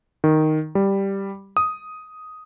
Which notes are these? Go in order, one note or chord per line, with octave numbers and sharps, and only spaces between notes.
D#3
G3
D#6